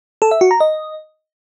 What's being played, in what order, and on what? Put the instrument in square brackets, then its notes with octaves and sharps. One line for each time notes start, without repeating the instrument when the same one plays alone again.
[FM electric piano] A4
E5
F#4
A#5
D#5